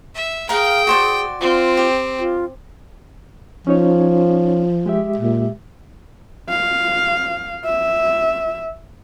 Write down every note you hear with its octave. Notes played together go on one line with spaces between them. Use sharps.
E5
G#4 A#4 F5 G5
F#4 C5 D5
C4 F4
G4
F4
F3 C#4 D#4 C#5
G#3 G4 E5
A#2
F5
E5